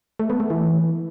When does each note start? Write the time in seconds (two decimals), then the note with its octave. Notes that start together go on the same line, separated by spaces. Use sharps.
0.20 A3
0.30 B3
0.40 A3
0.50 E3